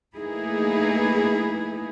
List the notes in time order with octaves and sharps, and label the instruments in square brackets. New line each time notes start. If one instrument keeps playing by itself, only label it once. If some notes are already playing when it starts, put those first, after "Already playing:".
[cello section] A3 A#3 D#4 E4 G#4 B4